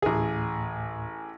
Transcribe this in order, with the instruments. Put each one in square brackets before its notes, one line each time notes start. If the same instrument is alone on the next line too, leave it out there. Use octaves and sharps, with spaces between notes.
[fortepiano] A1 G#4 [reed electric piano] D2 A2